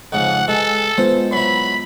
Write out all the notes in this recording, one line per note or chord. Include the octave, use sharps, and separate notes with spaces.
F2 G#2 C#3 F#5
E3 G#3 A4
G#3 B3 F4 C5
F#3 E4 B5